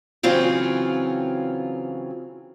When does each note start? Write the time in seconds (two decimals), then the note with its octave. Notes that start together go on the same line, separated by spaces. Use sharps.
0.23 C#3 E3 F#3 C4 F4